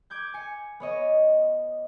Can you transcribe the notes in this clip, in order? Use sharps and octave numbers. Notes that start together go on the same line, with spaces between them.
D6 G6 G#6
G#5 C#7
B3 C#5 D#5